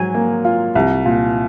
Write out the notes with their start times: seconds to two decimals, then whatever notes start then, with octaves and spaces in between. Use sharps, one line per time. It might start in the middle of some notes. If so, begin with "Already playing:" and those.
Already playing: G#2 F#3 G#5
0.14 A#3
0.45 F4
0.75 C2
1.06 A#2